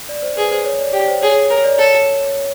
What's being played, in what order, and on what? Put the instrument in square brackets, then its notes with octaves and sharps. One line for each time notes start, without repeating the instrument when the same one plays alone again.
[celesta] D5
C5
[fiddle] G#4 [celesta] B4
[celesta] C5
C#5
D5
[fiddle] G4 [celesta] D5
[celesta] C5
[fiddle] G#4 [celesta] C#5
[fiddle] A#4 [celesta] C#5
[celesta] D5
[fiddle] A4 [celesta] C#5